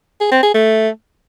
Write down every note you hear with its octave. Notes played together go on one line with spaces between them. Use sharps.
G#4
C4
G#4
A3